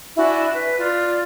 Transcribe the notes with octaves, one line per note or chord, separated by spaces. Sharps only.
D4 E4 F#4 G#5
B4
F4 D5